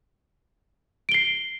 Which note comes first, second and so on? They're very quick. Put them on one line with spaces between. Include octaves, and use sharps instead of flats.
D7 G7 C7